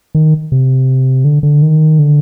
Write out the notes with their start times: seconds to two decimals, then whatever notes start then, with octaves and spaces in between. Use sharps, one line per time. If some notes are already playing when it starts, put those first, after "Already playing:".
0.15 D#3
0.52 C3
1.25 D3
1.43 D3
1.62 D#3
1.99 D3